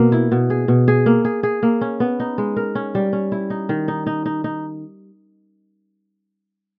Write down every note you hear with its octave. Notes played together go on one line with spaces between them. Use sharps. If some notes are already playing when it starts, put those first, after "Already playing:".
Already playing: B2 A#3
E4
B2
G#4
B2
G#4
A#3
G#4
G#4
A#3
C#4
B3
D#4
G#3
A#4
C#4
G3
C#4
E4
D#4
D#3
D#4
D#4
D#4
D#4